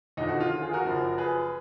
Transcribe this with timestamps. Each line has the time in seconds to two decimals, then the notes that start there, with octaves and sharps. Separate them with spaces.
0.17 D#2 D3 F3 D#4
0.29 D#4 F#4
0.40 F4
0.51 F4
0.62 F4 G#4
0.73 F#4 A#4
0.85 F#1 F#2 F3
1.18 G#4 B4